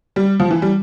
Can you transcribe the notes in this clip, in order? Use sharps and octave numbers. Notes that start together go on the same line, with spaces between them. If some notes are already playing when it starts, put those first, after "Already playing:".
G3
F3
E3
G3